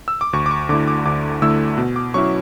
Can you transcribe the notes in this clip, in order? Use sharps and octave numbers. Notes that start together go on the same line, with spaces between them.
E6
D6
D2 C#6
D6
C#6
D3 A3 E4 D6
D6
D2 D6
D3 A3 E4 E6
B2
D6
F#3 C#4 E4 C#6